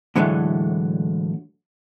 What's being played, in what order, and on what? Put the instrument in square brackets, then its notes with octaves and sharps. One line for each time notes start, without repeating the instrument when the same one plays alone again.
[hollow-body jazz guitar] A2 D3 E3 F#3 G#3 A3